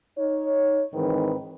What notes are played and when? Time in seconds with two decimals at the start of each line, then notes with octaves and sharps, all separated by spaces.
0.18 D#4 C#5
0.94 G#2 D#3 E3 C4 B4